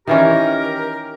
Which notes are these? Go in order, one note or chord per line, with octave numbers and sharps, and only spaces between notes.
D#3 E3 C#4 G4 A#4